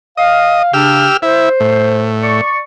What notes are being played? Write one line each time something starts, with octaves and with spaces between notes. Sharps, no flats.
D#5 F5
C#3 D4 G4 E6 F6
E4 C5
A2
D5 C#6